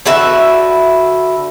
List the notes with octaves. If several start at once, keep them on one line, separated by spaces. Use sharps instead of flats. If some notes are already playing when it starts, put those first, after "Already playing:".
D3 F#4 B4 E5